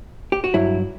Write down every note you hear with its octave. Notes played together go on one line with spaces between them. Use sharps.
G4
F#4
G2 F#3 E4